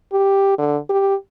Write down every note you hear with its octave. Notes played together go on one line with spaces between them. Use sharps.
G4
D3
G4